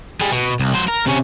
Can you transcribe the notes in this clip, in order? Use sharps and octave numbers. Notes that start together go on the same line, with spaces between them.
G3 G#4
B2
C2
F#3 C5
A#4
C3 C#4